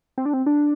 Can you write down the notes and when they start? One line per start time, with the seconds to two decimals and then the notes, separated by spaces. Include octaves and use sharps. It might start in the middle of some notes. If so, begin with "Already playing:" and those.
0.18 C4
0.26 D4
0.33 C4
0.46 D4